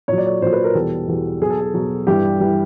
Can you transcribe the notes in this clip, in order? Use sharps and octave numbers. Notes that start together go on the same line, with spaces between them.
A#2 F#3 C#5
D5
C#5
A#2 F#3 C5
B4
A#4
E2 B2 G3 A4
E2 B2 G3
B2 F#3 G#4
A4
G#4
B2 F#3
G2 E3 G3 G4
E3 G3